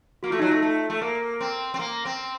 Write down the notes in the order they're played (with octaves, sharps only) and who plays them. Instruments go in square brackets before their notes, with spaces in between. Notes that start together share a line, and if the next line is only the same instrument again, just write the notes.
[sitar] A#3 [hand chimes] F#4
[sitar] A3 [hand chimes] F4
[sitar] F#3 [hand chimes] D#4
[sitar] A3 [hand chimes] F4
[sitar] A3
A3
[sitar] A#3 [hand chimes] A#4
[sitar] C4
C4
A#3
C4